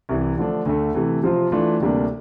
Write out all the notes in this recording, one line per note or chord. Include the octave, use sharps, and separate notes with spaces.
C2 C3 E3
D3 F3 A3 D4
D2 D3 A3
C3 E3 A3
C3 F3 C4 F4
E3 A3 D4 F4
D2 C3 G3 A#3 D4